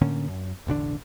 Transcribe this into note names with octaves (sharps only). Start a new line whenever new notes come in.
A2 D3 A#3 C#4
F#2
E1 A1 D3 D4